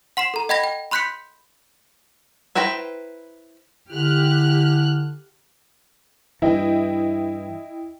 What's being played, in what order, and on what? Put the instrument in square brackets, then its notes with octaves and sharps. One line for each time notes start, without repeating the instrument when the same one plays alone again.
[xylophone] F#5 C6 C7 E7
A4 A#5
D#5 F#5 G5 B5 G#6 A#6
G5
B5 C6 F#6 G6 B6 C#7
[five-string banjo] E4 B4 C5 G5 A#5
[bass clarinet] D3 [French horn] E4 [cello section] G4 [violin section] F6 F#6
[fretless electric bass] G2 E3 [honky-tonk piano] E4 D#5 G5